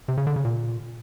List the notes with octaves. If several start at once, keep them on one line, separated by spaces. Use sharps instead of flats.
C3
C#3
D3
C#3
A#2